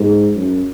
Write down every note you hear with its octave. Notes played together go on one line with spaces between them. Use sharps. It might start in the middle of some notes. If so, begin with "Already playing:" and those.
Already playing: G#2
F#2